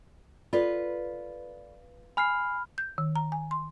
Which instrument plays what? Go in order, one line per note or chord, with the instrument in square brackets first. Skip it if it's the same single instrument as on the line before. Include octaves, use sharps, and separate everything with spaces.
[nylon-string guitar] F4 B4 [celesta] A4 D5 B5
[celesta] G#5 C7 [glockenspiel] B5 F6
[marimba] G6
D#3
A#5
G#5
C6